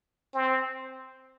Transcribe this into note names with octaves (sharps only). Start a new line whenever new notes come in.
C4